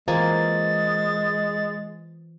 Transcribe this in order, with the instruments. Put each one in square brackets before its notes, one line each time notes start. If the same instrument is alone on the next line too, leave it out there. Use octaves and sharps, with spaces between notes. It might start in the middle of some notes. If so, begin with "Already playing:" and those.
[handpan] E3 F4 C5 [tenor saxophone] G#3 [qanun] A#3 G#5 [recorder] A6